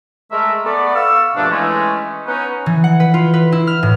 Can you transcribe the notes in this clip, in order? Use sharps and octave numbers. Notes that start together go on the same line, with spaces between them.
G#3 A3 A#4 E5
A3 B3 D5
F5 C#6 E6
G2 B2 F3 A3 A#3 D4
E3 G#3 A3 C#4
B3 C#4 D#4 F#5
E3
F#5
B4
F4
B4
E4
F6
A2